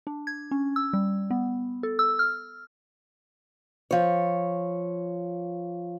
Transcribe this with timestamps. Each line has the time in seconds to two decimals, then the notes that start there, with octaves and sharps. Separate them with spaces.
0.07 D4
0.27 G#6
0.51 C#4
0.76 E6
0.93 G3
1.31 B3
1.83 A4
1.99 E6
2.19 F6
3.91 F3 C#5